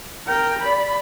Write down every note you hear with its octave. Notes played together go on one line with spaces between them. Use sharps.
A#4 G5
D5 B5